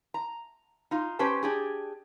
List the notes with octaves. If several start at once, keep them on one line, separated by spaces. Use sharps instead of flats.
A#5
D#4 F4
C#4 G4 B4 C5 A5
D4 G4 G#4